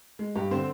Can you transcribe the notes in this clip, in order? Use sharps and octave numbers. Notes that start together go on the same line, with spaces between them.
G#3
G2 G4
D3 C4 C5